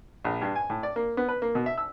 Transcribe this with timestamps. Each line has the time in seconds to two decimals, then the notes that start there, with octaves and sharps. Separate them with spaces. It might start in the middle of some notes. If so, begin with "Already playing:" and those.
0.25 A#1
0.42 G2
0.56 G#5
0.70 A2
0.83 D5
0.96 A#3
1.17 B3
1.28 B4
1.42 A#3
1.55 B2
1.66 E5
1.78 E6